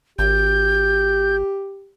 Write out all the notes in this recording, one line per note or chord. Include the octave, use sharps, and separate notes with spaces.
G#1 G4 G6